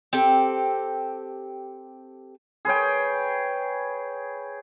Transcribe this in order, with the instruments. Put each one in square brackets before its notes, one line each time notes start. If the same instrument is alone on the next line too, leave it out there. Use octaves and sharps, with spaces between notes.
[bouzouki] C4 G4 A4
[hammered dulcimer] G#4 B4 C#5 G5